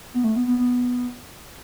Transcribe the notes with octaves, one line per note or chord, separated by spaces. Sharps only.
B3
A3
B3
B3
B3